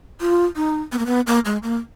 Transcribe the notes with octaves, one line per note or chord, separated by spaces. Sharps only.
F4
D#4
B3
A#3
B3
A#3
G#3
A#3